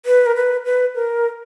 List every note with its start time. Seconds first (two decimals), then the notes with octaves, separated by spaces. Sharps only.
0.06 B4
0.26 A#4
0.36 B4
0.65 B4
0.95 A#4